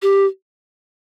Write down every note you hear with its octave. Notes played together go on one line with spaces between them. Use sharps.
G4